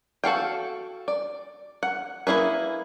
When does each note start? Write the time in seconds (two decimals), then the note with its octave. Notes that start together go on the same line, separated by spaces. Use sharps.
0.24 F#4 A4 F5 G5
1.08 D5
1.83 F#5
2.27 A#3 E4 G#4 B4